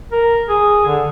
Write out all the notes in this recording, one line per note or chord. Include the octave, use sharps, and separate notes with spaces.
A#4
G#4
D3